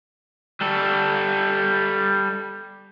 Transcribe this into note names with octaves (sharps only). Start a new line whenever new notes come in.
G3 A4